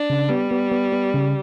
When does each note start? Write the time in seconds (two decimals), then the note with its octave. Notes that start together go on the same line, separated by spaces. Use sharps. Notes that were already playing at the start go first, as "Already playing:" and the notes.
Already playing: D4
0.10 C#3
0.30 G3 B3
0.51 B3
0.72 B3
0.92 B3
1.14 C#3